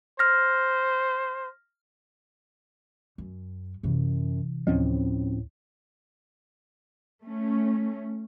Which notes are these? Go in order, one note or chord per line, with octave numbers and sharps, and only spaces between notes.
C5 F6 A#6
F#2
F#2 C3 E3
D2 A2 F3 C4 C#4
A3 C#4